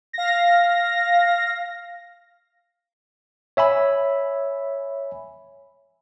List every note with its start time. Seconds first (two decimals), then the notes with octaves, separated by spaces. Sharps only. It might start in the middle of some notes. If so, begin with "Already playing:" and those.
0.13 F5 A#6
3.57 C#5 E5 G#5 B5